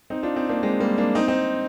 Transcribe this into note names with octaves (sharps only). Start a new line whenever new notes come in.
C4 D#4
D4 F4
C4 D#4
A#3 D4
G#3 C4
G3 A#3
A#3 D4
C4 D#4
C4 D#4